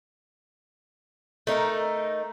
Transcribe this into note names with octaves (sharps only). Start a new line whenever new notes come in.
A3 D#4 F4 A#4